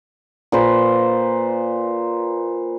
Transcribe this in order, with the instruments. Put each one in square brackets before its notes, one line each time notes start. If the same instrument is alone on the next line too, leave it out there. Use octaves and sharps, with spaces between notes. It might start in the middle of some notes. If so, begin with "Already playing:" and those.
[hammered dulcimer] A#2 B4 C5